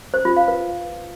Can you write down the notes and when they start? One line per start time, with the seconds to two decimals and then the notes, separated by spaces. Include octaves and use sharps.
0.14 C5
0.25 F4
0.37 F5
0.48 B4